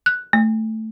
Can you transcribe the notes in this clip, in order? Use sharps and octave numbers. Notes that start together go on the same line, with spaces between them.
F#6
A3